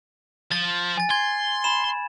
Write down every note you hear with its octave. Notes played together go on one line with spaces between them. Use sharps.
F3 A6
G#5 A6
C6 G#6
B5 E7